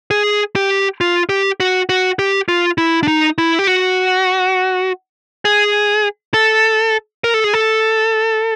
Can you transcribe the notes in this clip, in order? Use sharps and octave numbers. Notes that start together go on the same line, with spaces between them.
G#4
G4
F4
G4
F#4
F#4
G4
F4
E4
D4
D#4
E4
G4
F#4
G#4
A4
A#4
A4
G#4
A4